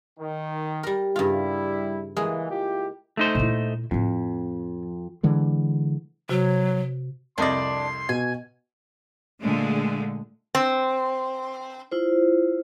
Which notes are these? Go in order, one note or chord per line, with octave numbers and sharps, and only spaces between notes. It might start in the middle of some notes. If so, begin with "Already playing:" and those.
D#3
G3 A#4
G2 C#3 G3 E4 F4
E3 G#3 A#3 G#4
E4 F4 G4
A3 D#4 C5
A#2 E4
F2 A2 F3
D3 E3 G#3
C3 F#3 F#4
C2 F2 D4 D5 D#5 C6
B2 G#5
A#2 D3 G#3 A3
C4
E4 F4 C5